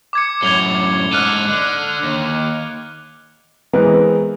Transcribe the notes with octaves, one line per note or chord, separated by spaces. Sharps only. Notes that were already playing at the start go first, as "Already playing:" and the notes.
D6 G#6 C#7
F#2 A2 G#6 F7 G7
G#2 A4 F6 F#6 D#7
D3
D#2
E3 G#3 B3 C4 A#4 B4